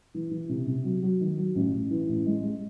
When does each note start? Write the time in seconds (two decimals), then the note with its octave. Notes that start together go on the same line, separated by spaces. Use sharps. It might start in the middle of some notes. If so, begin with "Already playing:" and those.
0.14 E3
0.31 E3
0.49 C3
0.67 C3
0.84 F#3
1.03 F#3
1.20 D#3
1.38 F#3
1.55 A1
1.73 A1
1.90 E3
2.08 A1
2.26 G#3
2.43 G#3